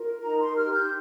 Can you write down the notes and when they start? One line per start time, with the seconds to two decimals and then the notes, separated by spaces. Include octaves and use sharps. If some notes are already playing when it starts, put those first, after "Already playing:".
Already playing: F4 A#4
0.23 D#4 A#5
0.40 C6
0.56 G4 F6
0.73 G6